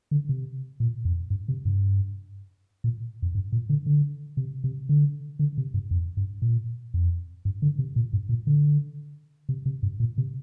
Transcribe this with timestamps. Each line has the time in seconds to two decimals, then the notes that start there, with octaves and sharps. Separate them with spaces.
0.11 D3
0.29 C3
0.80 A#2
1.05 F2
1.30 G2
1.48 C3
1.65 G2
2.84 A#2
3.22 F2
3.35 G2
3.52 A#2
3.69 D3
3.86 D3
4.37 C3
4.64 C3
4.89 D3
5.39 D3
5.58 C3
5.74 G2
5.91 F2
6.17 G2
6.42 A#2
6.94 F2
7.45 G2
7.62 D3
7.79 C3
7.96 A#2
8.13 G2
8.29 A#2
8.47 D3
9.49 C3
9.66 C3
9.83 G2
10.00 A#2
10.18 C3